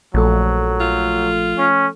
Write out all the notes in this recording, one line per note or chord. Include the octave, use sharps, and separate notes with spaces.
A#1 F3 F#3 A3 A4
F4
C#4